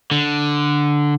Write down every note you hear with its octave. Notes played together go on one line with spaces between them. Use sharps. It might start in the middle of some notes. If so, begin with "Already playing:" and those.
D3